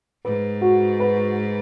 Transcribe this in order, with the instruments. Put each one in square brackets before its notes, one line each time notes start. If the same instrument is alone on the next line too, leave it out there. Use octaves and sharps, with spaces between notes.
[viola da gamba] G#2 [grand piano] B4
[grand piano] F#4
B4